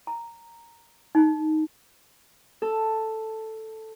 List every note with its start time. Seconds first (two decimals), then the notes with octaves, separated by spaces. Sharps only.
0.07 A#5
1.15 D#4
2.62 A4